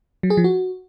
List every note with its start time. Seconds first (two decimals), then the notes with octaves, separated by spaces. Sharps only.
0.23 F#3
0.30 G#4
0.37 F3
0.44 F#4